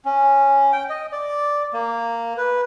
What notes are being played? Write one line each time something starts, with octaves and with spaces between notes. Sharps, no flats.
C#4
G5
D#5
D5
A#3
B4